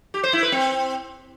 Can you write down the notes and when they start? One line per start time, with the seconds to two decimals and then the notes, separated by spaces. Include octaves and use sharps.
0.14 G4
0.24 C5
0.33 E4
0.43 B4
0.52 C4